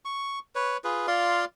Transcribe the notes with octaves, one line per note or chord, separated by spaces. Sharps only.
C#6
B4 C#5
F4 G#4 B4
F4 D5 F5 C6